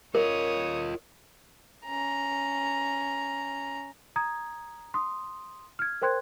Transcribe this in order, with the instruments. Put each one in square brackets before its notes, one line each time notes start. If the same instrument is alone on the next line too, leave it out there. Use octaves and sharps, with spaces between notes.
[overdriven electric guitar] F4 D#5 [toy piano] A#4 [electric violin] C#5 D#6
[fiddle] C#4 A#5
[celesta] A#5 D#6 G#6
C6 D#6
F6 G#6
A#4 C5 G5 C6 F#6 G#6